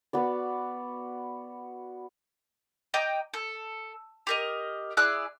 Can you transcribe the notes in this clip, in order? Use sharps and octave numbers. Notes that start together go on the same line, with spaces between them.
B3 F#4 D5
D#5 G5 A#5 D6
A4
G4 A#4 D#5
E4 G#4 D5 F#6